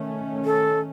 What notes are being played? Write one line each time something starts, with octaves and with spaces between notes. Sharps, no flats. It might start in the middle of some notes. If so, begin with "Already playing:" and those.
Already playing: D#3 A3 C#4
A4